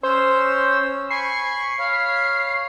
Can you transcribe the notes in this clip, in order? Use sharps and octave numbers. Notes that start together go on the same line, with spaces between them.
C#4 C5 C#5 E6
G#5 B5 C#6 C7
C#5 F5 B5